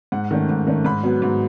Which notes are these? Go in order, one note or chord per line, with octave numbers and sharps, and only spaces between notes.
G#2 F#5
D#3 A3 C#4
G#2
D#3 A3 C#4
G#2 B5
F#3 B3
G#2